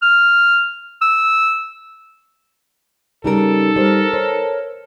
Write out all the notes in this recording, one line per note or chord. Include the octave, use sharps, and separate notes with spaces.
F6
E6
C#3 G3 D#4 A4 A#4
G3 A#4 C5
C5 C#5